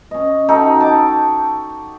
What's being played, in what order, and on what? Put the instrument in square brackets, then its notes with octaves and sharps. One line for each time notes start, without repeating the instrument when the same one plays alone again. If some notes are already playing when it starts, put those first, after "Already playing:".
[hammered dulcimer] C#4 D#5
D#4 F#4 A4 G5
A5 D6